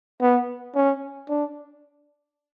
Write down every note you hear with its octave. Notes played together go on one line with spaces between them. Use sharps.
B3
C#4
D4